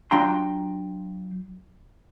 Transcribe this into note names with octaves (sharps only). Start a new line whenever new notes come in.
F#3 D4 F4 G5 A#5 C6